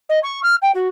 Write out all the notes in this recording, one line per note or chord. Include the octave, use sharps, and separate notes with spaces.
D#5
C#6
F6
G5
F#4